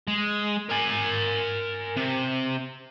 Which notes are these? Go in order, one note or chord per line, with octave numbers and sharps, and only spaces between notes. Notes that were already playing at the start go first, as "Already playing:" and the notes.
G#3
A#4 G#5
C3